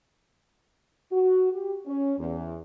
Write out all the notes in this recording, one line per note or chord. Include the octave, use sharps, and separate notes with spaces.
F#4
G4
C#4
E2